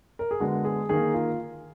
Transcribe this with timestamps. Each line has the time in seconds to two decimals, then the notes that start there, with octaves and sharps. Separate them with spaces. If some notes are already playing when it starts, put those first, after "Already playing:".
0.19 A#4
0.31 G#4
0.40 D3 G#3 B3 F#4
0.65 G#4
0.89 D#3 A#3 G#4
1.14 F4